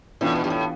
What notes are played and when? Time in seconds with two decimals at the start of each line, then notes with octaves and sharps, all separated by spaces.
0.21 A2 E3 B3 D4 F4
0.35 B2
0.44 G2
0.50 A2